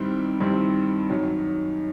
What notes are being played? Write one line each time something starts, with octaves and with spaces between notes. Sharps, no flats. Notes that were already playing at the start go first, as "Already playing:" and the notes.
Already playing: G2 D#3 G3 C4 E4
G2 D#3 G3 C4 E4
F#2 D#3 F#3